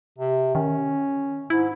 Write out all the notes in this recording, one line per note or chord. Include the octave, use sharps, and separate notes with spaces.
C3
D#3 C#4
G#2 E4